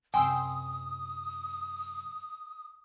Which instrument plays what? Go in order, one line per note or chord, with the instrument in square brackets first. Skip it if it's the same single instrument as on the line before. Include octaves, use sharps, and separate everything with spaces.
[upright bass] F#2 C3 [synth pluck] G5 C6 E6 [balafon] G#5 [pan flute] D#6